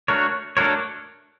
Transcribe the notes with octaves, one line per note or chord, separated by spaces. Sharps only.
A3 D4 F#4 A#4 C#5
A3 D4 F#4 A#4 C#5